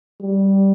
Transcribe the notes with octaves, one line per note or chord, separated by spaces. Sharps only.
G3